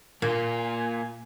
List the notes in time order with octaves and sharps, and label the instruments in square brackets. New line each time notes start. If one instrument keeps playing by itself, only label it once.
[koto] A#2 [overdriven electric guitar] A#3 F4 [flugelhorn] G#5